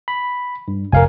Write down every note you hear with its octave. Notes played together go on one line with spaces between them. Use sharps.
B5
G2
F1 A#4 F5 G#5